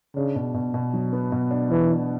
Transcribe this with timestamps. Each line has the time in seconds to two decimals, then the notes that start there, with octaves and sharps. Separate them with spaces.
0.16 C#3 D4
0.35 B2
0.54 B2
0.74 B2
0.93 F#3
1.13 B3
1.32 B2
1.51 D4
1.70 E3 D4
1.90 D4